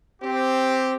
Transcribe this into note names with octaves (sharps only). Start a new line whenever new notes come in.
C4 G4